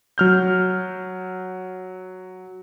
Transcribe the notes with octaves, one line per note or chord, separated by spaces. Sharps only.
F#3 F6 G6